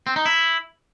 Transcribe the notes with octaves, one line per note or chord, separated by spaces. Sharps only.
C4
D#4
E4